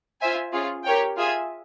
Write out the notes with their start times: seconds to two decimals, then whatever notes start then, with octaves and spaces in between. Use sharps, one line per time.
0.21 F4 C5 E5 G#5
0.53 C#4 F4 G#4
0.84 G4 A#4 C#5 G5
1.16 F4 G#4 E5 G#5